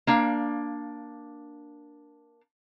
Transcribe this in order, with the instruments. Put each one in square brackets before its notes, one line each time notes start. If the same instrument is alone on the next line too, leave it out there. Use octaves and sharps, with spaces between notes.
[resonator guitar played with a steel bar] A#3 D4 F5